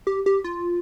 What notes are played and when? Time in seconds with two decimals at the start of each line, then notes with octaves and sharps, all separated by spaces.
0.07 G4
0.26 G4
0.44 F4